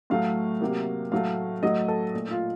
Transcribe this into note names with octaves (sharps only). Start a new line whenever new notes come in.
A2 F#3 A3 F5
C3 F#3 A#3
A2 F#3 A3 F5
A2 F#3 A3 D#5
A4
A#2 A3
F4